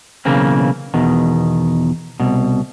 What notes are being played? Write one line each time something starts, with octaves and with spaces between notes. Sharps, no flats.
B1 C#3 E3 A#3 C4
E2 B2 D#3
C2 B2